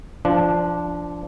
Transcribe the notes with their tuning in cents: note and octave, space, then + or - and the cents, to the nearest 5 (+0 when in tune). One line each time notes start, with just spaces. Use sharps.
F3 -20 D4 -5